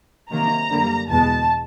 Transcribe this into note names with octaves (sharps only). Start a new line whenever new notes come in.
C3 D#3 F#3 A#3 A#5
F#2 D3 G3 A#3
E2 B2 G#3 B3 A5